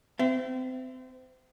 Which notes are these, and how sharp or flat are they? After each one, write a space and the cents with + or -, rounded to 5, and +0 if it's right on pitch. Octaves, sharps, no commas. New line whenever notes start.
C4 -30 E5 +20